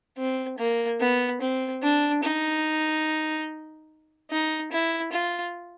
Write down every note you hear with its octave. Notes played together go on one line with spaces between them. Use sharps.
C4
A#3
B3
C4
D4
D#4
D#4
E4
F4